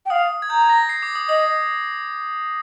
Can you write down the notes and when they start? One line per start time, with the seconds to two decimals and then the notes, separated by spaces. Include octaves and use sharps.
0.06 G5
0.10 F5 D#6
0.42 G#6
0.50 A#5 G6
0.62 G#6
0.69 A#6
0.89 C7
1.03 D6
1.15 D#6
1.29 D#5 D#6